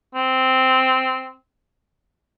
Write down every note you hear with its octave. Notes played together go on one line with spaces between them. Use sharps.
C4